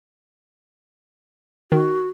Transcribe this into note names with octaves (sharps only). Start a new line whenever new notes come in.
D#3 F#4